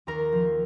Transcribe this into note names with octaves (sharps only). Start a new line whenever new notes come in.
D#2 A#4 A#5
F3